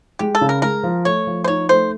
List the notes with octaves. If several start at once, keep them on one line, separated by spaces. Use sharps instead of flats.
G#3 G4
A4
C#3
A#4
G#3 A#4
F3
A3 C#5
F3
C5
D#4 C#5
A3 C5